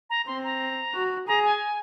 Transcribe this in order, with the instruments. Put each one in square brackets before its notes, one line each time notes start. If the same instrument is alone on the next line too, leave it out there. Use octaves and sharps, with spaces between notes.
[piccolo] A#5
[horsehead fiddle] C4 [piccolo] C6
[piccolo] A#5
[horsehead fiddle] F#4
[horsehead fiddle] G#4 [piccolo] A#5
[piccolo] G#5